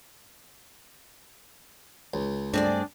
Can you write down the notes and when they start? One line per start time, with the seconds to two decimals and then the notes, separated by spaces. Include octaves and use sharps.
2.14 C#2
2.54 G2 A3 C4 D4 G#4 D5